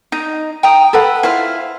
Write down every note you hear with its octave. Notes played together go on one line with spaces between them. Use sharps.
D#4
G5 A#5 D#6
A4 B4 E5 F#5
E4 F4 C5 F5